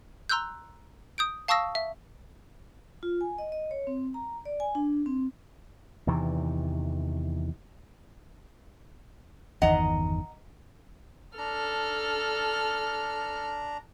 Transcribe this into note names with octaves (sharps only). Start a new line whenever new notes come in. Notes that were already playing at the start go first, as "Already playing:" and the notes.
A#5 C6 E6 F#6 G6
D#6 G6 D7
F5 A5 C#6 D#6 E6 A#6
E5
F4
G#5
D#5
D#5
C#5
C4
A#5
D5
G#5
D4
C4
E2 C3 D#3 E3
G1 E2 D#3 D#5 F#5 A#5
D4 A4 A#5 F6